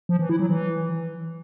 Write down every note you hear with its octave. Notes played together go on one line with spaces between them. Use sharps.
F3
E3
E4
F#3
E3